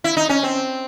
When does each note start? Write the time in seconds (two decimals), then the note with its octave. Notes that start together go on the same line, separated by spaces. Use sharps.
0.04 E4
0.17 D#4
0.29 C#4
0.43 C4